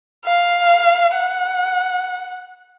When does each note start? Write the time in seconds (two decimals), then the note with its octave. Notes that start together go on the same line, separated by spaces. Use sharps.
0.25 F5
1.14 F#5